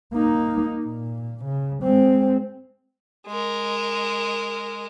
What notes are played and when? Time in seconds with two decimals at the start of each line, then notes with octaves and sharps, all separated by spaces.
0.14 A#3 D#4
0.86 A#2
1.45 C#3
1.83 G#3 C4
3.27 G#3 A#4